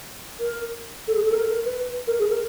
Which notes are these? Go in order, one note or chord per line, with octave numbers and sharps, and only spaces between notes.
A#4
A4
G#4
A4
A#4
A4
A#4
B4
A#4
G#4
A#4